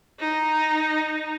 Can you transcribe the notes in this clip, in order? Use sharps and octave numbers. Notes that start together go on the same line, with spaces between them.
D#4